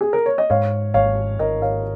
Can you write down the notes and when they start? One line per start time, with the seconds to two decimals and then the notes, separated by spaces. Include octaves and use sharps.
0.01 G#4
0.13 A#4
0.26 C#5
0.38 D#5
0.50 G#2 C#5 F5
0.94 G#1 C#5 F5
1.39 G#1 A#4 D#5
1.62 C#5 F5